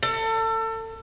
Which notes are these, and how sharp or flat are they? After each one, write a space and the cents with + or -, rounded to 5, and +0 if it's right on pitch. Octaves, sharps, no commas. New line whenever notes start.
A4 +30